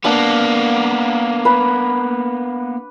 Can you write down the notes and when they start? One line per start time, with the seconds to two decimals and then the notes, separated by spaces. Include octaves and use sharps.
0.05 A#3 B3 D4 F5 A5
1.45 B4 B5